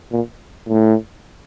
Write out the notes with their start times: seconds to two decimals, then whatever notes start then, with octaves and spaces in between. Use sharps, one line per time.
0.12 A#2
0.69 A2